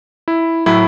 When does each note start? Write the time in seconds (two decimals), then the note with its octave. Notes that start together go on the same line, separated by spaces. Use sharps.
0.28 E4
0.66 A2 F#3 E4